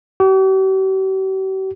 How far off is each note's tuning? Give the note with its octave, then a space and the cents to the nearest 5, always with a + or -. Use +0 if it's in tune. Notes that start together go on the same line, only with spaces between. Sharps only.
G4 -45